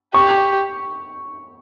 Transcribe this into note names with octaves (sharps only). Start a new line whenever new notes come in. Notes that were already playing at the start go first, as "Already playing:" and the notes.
G4 C#6